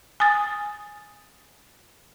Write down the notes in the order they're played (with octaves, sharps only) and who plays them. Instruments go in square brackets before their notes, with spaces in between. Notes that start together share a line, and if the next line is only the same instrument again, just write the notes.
[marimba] G#5 D#6 A6